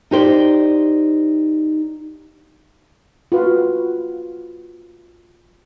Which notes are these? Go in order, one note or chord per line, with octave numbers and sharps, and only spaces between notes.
D#4 G4 C5 D5
F4 F#4 B4